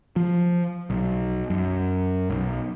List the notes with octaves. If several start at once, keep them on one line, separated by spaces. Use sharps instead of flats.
F3
B1
F#2
B1